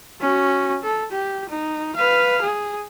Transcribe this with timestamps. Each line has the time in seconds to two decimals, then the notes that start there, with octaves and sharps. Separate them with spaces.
0.21 C#4 F#4
0.83 A4
1.12 G4
1.49 D#4
1.96 B4 F5
2.42 G#4